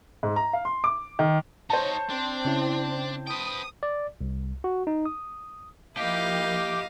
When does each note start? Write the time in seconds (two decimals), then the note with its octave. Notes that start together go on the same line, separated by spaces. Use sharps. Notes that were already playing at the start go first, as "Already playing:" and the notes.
0.23 G#2
0.36 A#5
0.53 F5
0.65 C6
0.84 D6
1.19 D#3
1.70 D#4 F#4 C5 C#5 A5
2.10 C4 D4
2.45 C#3 C#4 E4
3.27 B4 G5 D#6
3.83 D5
4.21 C2
4.64 F#4
4.87 D#4
5.06 D#6
5.97 F3 A#3 E4 G4 D#5 F5